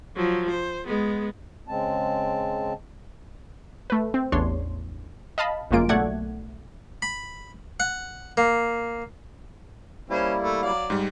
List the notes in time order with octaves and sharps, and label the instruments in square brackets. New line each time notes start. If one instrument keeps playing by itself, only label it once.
[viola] F3 F#3
C5
G#3 B3
[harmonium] C#3 G#3 C4 A5
[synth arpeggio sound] A3 B4
C4
A1 E2 D4 C#5 C6
D#5 F5 A5 B5
G1 F#2 G#3 A#3 F4 D7
B1 A3 D5 F#5 G#6
[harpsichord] B5
F#5
A#3
[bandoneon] G3 A#3 E4 [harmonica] C#4 C5
[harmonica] A3
[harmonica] F#3 D5 [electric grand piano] F5
[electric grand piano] G#2 G3